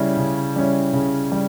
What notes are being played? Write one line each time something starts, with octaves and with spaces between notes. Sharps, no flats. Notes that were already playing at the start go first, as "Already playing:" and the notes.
Already playing: C#3 G3 C#4 E4
C#3
G3 C#4 E4
C#3
G3